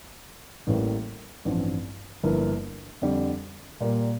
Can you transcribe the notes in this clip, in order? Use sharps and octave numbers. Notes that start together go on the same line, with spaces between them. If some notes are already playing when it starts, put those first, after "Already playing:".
A1 A2 E3 G3 A#3
A1 G2 F3 C4
G1 G2 F3 A#3 E4
F2 D3 G3
A#2 G3 A#3